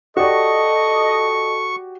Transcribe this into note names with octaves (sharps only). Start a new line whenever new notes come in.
F#4 G4 A4 D5 D#5 C#6